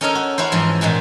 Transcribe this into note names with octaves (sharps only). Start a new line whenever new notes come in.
C#4 D#4 A4 A#4 C#5 D#5
F#4
C#4 E4 F#4 C5
G#2 E3 F3
A#2 D#3 G#3 F#4